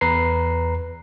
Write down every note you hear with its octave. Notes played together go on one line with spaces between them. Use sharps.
E2 B4 A#5 C7